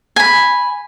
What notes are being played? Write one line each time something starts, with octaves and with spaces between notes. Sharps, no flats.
G#5 B5